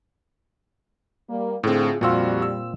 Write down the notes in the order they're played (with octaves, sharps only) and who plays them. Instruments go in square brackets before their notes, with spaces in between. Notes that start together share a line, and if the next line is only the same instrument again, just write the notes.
[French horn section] G3 A#3
[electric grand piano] A2 D3 C4 [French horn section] F4 G#4
[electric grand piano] F2 F#4 E6 [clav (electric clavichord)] A#2 C4 F4 [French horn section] G3
[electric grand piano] E6